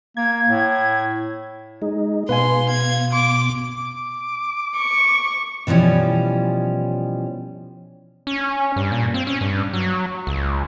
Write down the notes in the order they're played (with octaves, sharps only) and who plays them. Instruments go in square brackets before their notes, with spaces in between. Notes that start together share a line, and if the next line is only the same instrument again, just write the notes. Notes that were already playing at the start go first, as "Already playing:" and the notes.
[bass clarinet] A#3 [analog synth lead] G#6
[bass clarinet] A2
[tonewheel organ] G#3 D#4
[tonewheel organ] B2 [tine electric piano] B4 F5 G#5 [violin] C6
[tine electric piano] F5 [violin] G#6
[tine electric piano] C6 [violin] D6
[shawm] D6
[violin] C#6
[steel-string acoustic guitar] B2 E3 F3 G3 C#4
[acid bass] C#4
G2
A#2
C4
C#4
G2
F#3
C#2